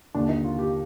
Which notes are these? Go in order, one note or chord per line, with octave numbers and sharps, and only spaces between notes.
D#2 D3 D4
D#4
F4
G4